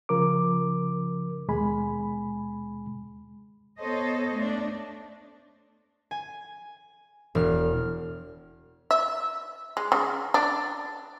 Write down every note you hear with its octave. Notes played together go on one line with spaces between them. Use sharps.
C#3 F3 A#4 D6
D#2 B2 G#3 G#5 B5
B3 A4 C5 C#5 D#5
A3 D4
G#5
E1 F6
E5
G#3
C#3
D4